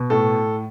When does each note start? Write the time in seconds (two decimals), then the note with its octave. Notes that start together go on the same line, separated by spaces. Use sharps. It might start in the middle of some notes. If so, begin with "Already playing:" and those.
Already playing: B2
0.10 A2 A4